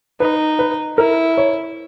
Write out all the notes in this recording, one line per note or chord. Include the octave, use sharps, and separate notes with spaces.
D#4 B4
B4
E4 A#4
C#5